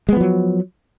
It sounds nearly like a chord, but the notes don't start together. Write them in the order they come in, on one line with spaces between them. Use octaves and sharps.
G#3 B3 F3 F#3